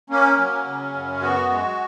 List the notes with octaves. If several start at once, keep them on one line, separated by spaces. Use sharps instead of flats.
A#3 C#4
F#3
C#3
F#2
B3 F#4
G#3